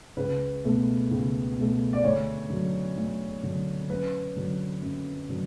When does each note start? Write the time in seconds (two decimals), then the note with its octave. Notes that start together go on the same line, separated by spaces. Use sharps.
0.17 C#2 B4
0.65 B2 A3
1.11 C#2
1.57 B2 A3
1.93 D5
2.04 D2 C#5
2.49 D3 F#3
2.97 D2
3.43 D3 F#3
3.90 F#2 B4
4.36 D3 F#3
4.82 F#2
5.29 D3 F#3